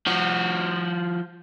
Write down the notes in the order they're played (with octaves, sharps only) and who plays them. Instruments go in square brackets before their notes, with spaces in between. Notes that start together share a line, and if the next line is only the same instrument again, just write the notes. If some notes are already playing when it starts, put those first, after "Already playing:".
[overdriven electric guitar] F3 F#4